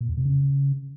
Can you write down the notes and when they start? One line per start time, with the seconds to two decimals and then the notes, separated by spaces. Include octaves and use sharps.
0.01 A#2
0.09 E2
0.17 C3
0.25 C#3